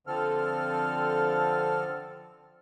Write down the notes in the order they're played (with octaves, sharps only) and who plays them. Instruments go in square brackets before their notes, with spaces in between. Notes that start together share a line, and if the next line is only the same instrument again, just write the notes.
[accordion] D3 F3 C4 A4 F6